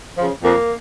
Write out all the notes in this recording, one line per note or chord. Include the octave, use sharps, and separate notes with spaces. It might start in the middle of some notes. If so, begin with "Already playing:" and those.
C#3 F3
F2 A#3